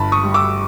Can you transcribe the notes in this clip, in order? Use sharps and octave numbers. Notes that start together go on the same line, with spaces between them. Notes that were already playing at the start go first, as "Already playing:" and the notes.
Already playing: G1 A5 B5
C#6 D#6
G3
D6 E6